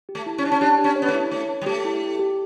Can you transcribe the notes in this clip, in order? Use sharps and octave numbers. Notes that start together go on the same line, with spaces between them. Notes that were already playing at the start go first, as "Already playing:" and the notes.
G4
A3
E4
C#4
D4 C#5
C#4
D4 G4
G4
C#4
C#5
B3
A3
E4
A3 C#5
C#5
G3
A3 G4
E4
G4
G4